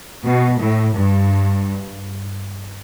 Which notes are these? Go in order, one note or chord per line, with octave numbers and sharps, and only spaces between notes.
B2
A2
G2